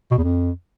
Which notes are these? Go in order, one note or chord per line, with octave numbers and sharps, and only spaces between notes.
B2
E2
F2